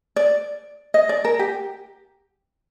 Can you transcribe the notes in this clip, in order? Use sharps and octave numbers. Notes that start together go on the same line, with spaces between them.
D5
D#5
D5
A#4
G4